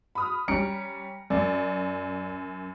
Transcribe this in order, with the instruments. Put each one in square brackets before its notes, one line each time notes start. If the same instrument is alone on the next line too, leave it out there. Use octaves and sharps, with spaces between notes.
[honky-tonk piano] B5 D#6 F6
[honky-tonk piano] G3 C#4 [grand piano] A#5 C#7 D7
[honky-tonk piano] F#2 [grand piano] D5